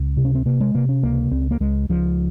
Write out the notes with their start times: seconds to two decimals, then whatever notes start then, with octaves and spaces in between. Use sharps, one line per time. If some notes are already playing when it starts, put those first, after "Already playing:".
Already playing: C#2
0.17 C3
0.25 C#4
0.35 C4
0.45 C3 A#3
0.61 G#3
0.75 C3 A#3
0.89 C#4
1.03 C#2 A#3
1.31 C#2 C4
1.51 A#3
1.60 C#2 G#3
1.89 C#2 F3